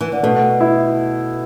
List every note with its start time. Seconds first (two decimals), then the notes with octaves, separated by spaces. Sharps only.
0.01 E3
0.12 D3
0.23 B2 A3
0.60 E4